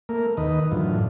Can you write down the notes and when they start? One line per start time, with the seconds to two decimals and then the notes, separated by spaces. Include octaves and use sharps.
0.09 A3 A#3 A#4
0.37 D#2 D#3 B4 D#5
0.72 F#2 A2 D3 E3 F4